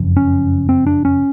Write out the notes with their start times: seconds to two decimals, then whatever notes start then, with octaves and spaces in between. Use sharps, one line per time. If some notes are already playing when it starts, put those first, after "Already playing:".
Already playing: F#1 F2 C#3
0.17 C#4
0.69 C4
0.87 D4
1.05 C#4